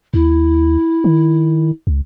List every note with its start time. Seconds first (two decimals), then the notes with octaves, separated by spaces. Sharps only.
0.14 D#2 E4
1.04 D#3
1.87 C#2